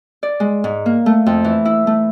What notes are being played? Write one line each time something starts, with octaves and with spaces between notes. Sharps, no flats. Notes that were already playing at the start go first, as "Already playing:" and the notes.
D5
G#3
G#2
A#3
A3
F2
E3
E4
A3